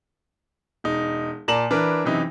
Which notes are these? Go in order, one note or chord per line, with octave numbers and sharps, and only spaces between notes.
E1 D#4
A#2 D5 A5 A#5 E7 F#7
E3 D4 A#4 B4
F#2 C3 E3 D#4